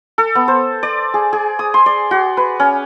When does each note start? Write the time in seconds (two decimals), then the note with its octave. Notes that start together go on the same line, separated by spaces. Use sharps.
0.18 A4
0.35 B3
0.48 C5
0.83 D5
1.14 G#4
1.33 G#4
1.59 D#6
1.74 C6
1.86 D5
2.11 F#4
2.37 B4
2.60 C#4